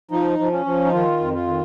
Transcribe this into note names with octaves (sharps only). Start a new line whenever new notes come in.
F3 D#4
F3
C#4
F3
D#4
D#3 F4
F2
F4
D#3